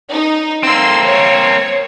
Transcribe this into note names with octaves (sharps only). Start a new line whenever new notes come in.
D#4
A#3 C4 C6 E6
C#5